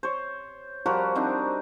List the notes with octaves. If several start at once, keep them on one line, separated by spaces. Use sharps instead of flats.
C5 C#5
F3 G3 F#4 A#4
C4 D4 D#4